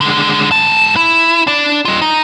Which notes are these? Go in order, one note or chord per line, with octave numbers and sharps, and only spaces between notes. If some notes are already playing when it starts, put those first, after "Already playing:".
D3 G#3
G#2 A5
E4
D4 D5
F4 D#5
D#4